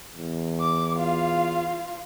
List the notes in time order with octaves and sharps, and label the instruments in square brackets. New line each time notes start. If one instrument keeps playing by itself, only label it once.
[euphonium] E2
[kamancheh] D6
F4 F5